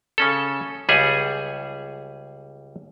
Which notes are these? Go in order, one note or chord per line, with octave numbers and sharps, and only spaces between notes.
C#3 C#4 A4
C#2 G3 G#4 E5 F#5